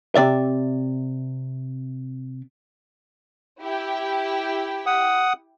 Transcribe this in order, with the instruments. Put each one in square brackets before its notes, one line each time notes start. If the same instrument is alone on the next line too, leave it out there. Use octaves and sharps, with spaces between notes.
[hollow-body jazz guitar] C3 D5 E5
[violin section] E4 G4 G5
[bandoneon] F#5 D#6